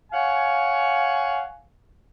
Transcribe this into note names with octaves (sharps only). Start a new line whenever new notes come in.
C#5 F5 F#5 G#5